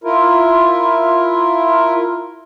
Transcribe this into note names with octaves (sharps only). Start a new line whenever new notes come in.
E4 F4 A#4